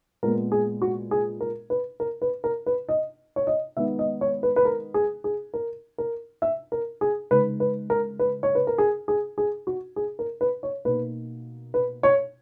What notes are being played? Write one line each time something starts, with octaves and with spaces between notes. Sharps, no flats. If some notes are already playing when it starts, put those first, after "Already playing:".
A#2 G#3 B3 A#4
G#4
F#4
G#4
A#4
B4
A#4
B4
A#4
B4
D#5
C#5
D#5
D#3 G#3 B3 D#4 E5
D#5
C#5
B4
B4
A#4
G#4
G#4
A#4
A#4
E5
A#4
G#4
C#3 G#3 D#4 B4
B4
A#4
B4
C#5
B4
A#4
G#4
G#4
G#4
F#4
G#4
A#4
B4
C#5
B2 A#3 D#4 B4
B4
C#5